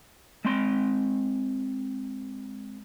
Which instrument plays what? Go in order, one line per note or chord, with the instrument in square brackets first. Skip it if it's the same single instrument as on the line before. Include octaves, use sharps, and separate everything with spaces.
[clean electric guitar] G#3 C4 C6